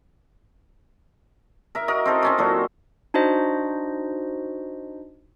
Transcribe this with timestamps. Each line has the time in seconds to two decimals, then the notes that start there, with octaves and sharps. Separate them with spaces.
1.75 A#4 E5
1.88 F#4 A#4 D#5
2.05 C4 D#4 A4 A#4
2.23 C4 C#4 F#4
2.38 A#2 F#3 A4
3.14 D4 D#4 F#4 C5 D#5